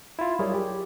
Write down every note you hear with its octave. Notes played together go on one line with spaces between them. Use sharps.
E4 F4
F#3 G3 E4 G#4 A#4 C#5
G4